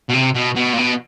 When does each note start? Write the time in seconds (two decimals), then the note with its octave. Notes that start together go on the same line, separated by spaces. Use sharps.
0.09 B2
0.13 C3
0.34 B2
0.56 B2
0.73 A#2
0.78 B2